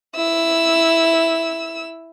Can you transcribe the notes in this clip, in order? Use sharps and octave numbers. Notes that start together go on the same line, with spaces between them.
E4 E6